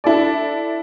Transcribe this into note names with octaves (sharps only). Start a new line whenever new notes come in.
D4 E4 A4 D5